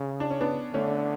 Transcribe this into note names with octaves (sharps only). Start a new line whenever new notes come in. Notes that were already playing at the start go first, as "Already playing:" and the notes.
Already playing: C#3
D4
C#4
B3 D4
D3 A3 C#4